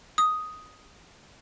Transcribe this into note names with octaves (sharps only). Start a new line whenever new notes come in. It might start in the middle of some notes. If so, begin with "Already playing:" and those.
D#6